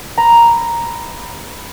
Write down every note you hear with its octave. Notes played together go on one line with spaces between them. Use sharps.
B4 A#5